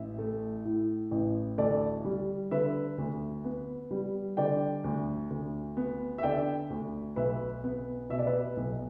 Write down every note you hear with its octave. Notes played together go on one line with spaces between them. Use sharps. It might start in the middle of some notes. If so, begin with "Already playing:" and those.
Already playing: A1 E5
A3
A2
A1
D2 A4 D5
G3
D3 B4 E5
D2
B3
G3
D3 D5 G5
D2
D2
B3
E5
D3 D5 G5
D2
B1 B4 E5
B3
B2 E5
D5
B4 E5
B1